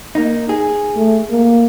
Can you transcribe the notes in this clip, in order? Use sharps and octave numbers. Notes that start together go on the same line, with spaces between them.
A#3 D#4
G#4
A3
A#3